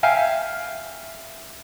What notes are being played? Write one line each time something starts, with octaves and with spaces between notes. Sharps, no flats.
E5 F5 G5 G#5